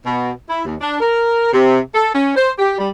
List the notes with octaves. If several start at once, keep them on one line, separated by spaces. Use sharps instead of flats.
B2
E4
D#2
D4
A#4
C3
A4
C#4
C5
G4
G3